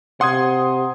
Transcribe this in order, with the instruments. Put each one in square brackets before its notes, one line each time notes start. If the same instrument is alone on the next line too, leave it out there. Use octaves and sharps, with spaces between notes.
[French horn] C3 [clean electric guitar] F#5 [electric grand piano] C6 D#6 G#6